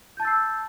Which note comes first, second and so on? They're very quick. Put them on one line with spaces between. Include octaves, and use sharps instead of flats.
G6 A5 A6 E6 C7